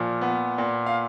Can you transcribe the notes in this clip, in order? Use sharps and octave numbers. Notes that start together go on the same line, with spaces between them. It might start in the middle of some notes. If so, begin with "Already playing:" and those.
Already playing: A#2 F3
B3
A#2
F5